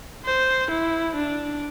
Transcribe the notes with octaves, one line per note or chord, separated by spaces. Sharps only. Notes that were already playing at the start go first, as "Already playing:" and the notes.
C5
E4
D4